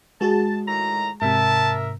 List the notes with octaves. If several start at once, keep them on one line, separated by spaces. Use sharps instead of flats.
G#3 F#4 G#4 A5
A2 D#3 A#5
G#2 C3 A#4 E5 A5